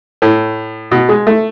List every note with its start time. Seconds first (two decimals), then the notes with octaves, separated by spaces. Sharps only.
0.22 A2
0.91 B2
1.09 G#3
1.27 A3